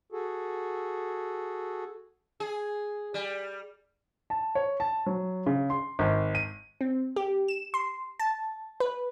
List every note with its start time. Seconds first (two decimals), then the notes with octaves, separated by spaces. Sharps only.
0.12 F#4 G#4 A4
2.40 G#4
3.14 G3
4.30 A5
4.55 C#5
4.80 A5
5.06 F#3
5.46 C#3
5.70 C6
5.99 G#1
6.35 D#7
6.81 C4
7.16 G4
7.48 E7
7.74 C6
8.20 A5
8.80 B4